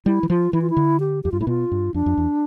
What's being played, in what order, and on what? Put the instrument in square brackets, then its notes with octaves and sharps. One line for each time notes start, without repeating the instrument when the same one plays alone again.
[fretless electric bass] G3 [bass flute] E4
[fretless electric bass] E3
[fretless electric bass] F3 [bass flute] F4
[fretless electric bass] E3 [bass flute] E4
[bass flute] F4
E4
[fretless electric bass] D3
[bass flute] G4
[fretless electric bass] F2 [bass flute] G4
[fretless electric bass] G2 [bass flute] F4
[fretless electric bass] A2 [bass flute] E4
[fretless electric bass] B2 [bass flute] F4
[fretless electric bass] G2
[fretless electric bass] F2 [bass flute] D4
[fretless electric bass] F2
E2